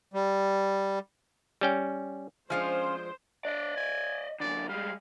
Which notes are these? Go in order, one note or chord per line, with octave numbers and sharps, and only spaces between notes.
G3
G3 C#4 G5
F3 G#3 C#4 D4 F4 C5
D4 D5 D#5
G#5
F#2 D3 D5
G3 G#3 F5